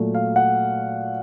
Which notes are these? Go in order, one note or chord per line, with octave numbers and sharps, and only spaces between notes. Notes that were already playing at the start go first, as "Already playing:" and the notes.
Already playing: A#2 F#3 A3
F5
F#5